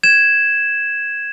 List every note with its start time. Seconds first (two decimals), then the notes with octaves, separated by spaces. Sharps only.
0.03 G#6 E7